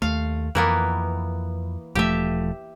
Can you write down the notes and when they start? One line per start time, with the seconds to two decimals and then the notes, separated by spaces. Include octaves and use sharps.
0.02 D#2 A3 F5
0.55 F2 E3 A#3 B3
1.95 E1 F3 A3 G4 E5